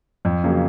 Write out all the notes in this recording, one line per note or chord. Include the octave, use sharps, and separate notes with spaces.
F2
C#3 F#3 A#3